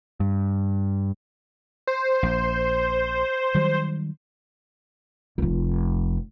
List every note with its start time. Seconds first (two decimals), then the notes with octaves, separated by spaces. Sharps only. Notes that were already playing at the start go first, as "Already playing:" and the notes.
0.20 G2
1.87 C5
2.23 A#1
3.54 D#3 F#3 G3
5.38 F1 F3